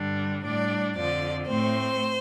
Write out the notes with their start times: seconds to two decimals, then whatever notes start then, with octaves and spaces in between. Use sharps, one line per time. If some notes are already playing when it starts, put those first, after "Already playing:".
Already playing: G2 D3 G3 D4
0.44 A2 G3 D4 D5
0.96 F2 D3 F3 D5
1.48 A2 A3 C4 C5